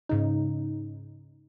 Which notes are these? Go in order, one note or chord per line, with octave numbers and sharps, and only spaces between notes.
G#2 C#3 D#4